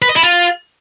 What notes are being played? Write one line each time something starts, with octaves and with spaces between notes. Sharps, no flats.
B4
D#5
E4
F4